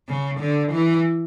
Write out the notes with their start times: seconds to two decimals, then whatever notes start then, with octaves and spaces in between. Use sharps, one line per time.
0.09 C#3
0.40 D3
0.72 E3